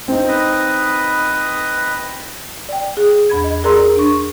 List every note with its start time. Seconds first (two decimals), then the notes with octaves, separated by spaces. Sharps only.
0.08 C4 D#4
0.28 B4 D#5 D#6
2.69 D5 G5
2.97 G#4
3.30 E2 B5 G#6
3.44 D#5
3.64 G#4 A#4 D5 A#5 C6 E6
3.96 D4 C#6